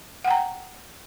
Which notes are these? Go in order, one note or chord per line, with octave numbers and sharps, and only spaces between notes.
F#5 G5 A#5